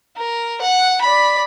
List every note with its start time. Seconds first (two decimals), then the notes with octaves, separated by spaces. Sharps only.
0.16 A#4
0.61 F#5
1.01 D5 B5